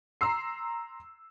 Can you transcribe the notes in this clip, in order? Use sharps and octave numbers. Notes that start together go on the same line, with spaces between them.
A#5 C6 E6 C7